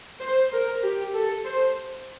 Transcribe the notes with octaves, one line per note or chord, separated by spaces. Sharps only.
C5
A#4
G4
A4
C5